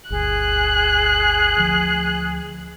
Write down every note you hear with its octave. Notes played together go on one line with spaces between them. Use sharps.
G1 D2 G#4 F#6
D2 F3